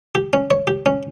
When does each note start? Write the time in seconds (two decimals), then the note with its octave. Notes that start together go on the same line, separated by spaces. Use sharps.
0.15 G4
0.33 C#4
0.51 C#5
0.67 G4
0.86 C#4